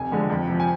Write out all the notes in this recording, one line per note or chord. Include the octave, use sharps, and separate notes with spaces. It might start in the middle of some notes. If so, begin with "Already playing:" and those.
Already playing: F1 G#5
F2 D3 G#3
F2
C3 F3
G#5